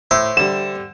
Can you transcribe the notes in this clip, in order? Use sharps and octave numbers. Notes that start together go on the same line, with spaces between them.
A2 C5 E5
D3 G3 E7